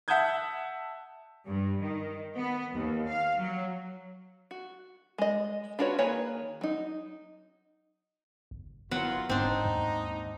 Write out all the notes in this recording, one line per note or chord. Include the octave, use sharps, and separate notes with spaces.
E5 F#5 A5 D#6 G6 G#6
G2
D#3
B3
D#2
F5
F#3
F#4
G#3 D#5
D4 F4 F#4 B4 C#5
D#3 A#3 G#4 B4 C#5
F#3 D#4
F#1
D#3 F#3 B3 E4 F4 F#5
E1 G#2 C4 D4 D#4
D#2